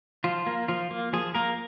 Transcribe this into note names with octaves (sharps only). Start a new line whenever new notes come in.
F3 F4
A#3
F3 F4
A#3
F3 G#4
A#3 A#4